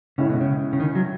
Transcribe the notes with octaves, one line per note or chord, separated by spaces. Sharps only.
A2 C#3 G#3 C#4 E4
B2
C#3
C#3
D#3
F#3